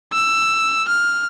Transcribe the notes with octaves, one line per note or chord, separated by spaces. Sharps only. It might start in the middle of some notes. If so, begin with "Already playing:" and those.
E6
F6